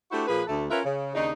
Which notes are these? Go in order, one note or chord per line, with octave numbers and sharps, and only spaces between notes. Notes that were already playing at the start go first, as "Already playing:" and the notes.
A3 D4 E4 F#4 G4 C5
A#2 F3 G#4 B4
D2 A3 A4
C#4 F4 A#4 B4 E5 F5
C#3
D#2 C#3 D4 D#4